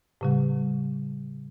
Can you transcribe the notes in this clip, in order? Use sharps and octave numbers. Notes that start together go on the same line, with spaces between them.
A2 C#3 G3